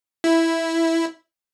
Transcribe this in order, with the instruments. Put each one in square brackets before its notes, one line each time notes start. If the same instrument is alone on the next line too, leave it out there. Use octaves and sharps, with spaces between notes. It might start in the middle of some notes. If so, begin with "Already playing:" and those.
[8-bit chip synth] E4